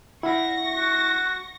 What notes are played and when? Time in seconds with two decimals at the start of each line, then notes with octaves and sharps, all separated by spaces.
0.23 E4 E5 F#5 C#6 A#6
0.75 F#4